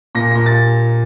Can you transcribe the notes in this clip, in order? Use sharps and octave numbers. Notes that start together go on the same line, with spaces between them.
A#2 A#6
A#2 A#6
A6